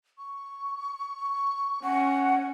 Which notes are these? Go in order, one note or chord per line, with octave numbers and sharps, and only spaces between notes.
C#6
C#4 F#5